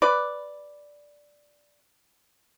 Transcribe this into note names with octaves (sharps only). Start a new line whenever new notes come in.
B4 D5